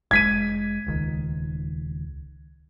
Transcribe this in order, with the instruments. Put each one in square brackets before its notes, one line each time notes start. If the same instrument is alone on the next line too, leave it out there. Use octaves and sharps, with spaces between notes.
[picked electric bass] F1 G#3 [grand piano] G#6 B6 D#7
[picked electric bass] D#1 C#2 D#3